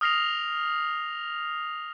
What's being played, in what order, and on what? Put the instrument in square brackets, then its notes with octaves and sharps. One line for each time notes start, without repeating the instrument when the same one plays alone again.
[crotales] D#6 F6 A#6 C7 F7